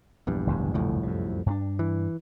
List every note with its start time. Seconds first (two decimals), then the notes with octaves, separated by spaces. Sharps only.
0.27 A#1 E2 G2
0.47 F#1 D2 G#2
0.74 C2 F2 A2
1.03 F#2 C3
1.46 G2 A3 D4
1.79 E3